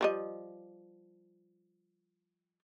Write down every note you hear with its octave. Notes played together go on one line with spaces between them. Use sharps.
F3 G3 D#5